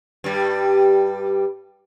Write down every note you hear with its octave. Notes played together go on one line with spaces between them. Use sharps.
G2 G3